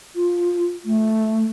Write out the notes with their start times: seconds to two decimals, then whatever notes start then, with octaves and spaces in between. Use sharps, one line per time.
0.16 F4
0.85 A3